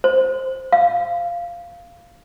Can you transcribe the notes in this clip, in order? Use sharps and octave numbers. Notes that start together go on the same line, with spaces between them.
C5
F5